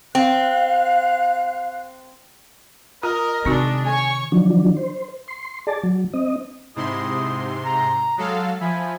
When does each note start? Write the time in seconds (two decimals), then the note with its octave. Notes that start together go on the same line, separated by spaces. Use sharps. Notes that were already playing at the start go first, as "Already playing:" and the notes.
0.15 C4 F5 F#6
3.03 F4 A#4 D#5
3.45 C3 D#3 G#3 C4 D4 D#4 F#4
3.86 C#5 G#5 C#6
4.32 D#3 F3 F#3 D4
4.77 C5
5.28 C6
5.67 G#4 D5 A5
5.83 F#3
6.14 C4 D#5
6.76 G#2 C3 E4 D#5 C6
7.65 A#5
8.18 F#3 G#3 A4 F5
8.61 F3 E5 G#5 B5